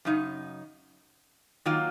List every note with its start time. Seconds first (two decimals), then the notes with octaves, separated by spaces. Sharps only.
0.05 F#2 C#3 D#4
1.65 D#3 F#3 A#3 F4